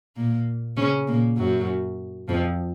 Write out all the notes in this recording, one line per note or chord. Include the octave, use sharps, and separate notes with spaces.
A#2 A#3
C#3 C#4
A#2 A#3
F#2 F#3
F2 F3